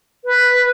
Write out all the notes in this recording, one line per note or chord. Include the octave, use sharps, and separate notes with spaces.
B4